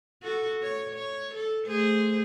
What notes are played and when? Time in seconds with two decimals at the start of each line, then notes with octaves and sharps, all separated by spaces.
0.22 F#4 A4
0.62 C#5
0.95 C#5
1.35 A4
1.66 A3 G#4 C5